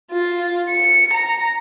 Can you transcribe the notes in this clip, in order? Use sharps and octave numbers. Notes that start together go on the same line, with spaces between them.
F4
C#7
A#5